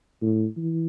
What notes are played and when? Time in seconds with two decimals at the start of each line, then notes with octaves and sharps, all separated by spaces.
0.22 A2
0.57 E3